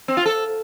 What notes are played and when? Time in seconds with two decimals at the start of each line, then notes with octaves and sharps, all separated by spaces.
0.08 C4
0.17 F4
0.26 A4